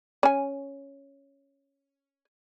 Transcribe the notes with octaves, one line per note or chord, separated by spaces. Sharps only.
C#4 G#5